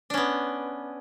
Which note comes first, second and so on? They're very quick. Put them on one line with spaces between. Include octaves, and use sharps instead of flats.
D4 C#4 B3